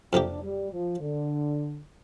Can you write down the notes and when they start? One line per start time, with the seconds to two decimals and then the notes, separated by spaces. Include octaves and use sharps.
0.13 F2 C3 A#3 D4 G4
0.42 G3
0.72 F3
1.00 D3